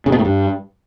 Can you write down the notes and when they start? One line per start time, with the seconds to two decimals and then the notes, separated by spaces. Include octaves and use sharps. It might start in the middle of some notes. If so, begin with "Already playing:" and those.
0.06 C#3
0.12 B2
0.19 A2
0.25 G2